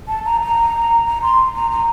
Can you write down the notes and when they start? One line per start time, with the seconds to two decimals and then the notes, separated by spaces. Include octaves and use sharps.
0.08 A5
0.26 A#5
0.42 A#5
1.07 A#5
1.22 C6
1.56 A#5
1.71 A#5